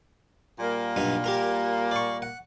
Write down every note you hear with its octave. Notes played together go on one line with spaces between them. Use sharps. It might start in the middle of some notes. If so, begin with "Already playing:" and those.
A#2 G3 A#3
B1 G2 D#4
G4 A#4 A#5
D5 C#6
F#5